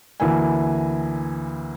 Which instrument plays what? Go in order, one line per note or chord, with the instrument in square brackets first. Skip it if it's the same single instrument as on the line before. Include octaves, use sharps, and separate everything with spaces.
[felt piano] D2 E3 A#3 E4 E5 G#5